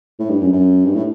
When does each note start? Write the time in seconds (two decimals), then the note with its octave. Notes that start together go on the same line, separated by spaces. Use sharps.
0.19 A2
0.30 G2
0.42 F#2
0.52 F#2
0.85 G2
0.95 A2